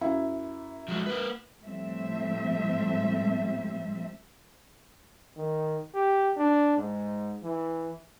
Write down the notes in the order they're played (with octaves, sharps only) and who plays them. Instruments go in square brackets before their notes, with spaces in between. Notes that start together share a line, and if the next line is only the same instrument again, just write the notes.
[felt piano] F#2 E4
[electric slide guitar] F3 F#3 G#3
A#3 B4
[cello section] A2 F3 G3 C4 E5
[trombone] D#3
G4
D4
G#2
E3